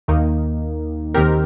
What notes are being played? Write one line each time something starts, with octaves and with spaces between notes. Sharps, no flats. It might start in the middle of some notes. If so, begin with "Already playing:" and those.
D#2 D#3 A#3 D#4
D#2 D#3 C4 G4 A#4